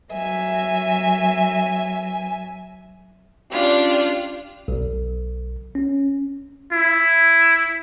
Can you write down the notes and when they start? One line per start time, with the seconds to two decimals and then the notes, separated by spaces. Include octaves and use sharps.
0.12 F#3 E5 G#5
3.51 C#4 D4 F4 G4
4.68 B1
5.75 C#4
6.73 E4